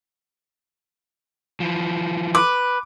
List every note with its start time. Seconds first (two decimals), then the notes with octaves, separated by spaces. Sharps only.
1.60 E3 F3
2.35 B4 D6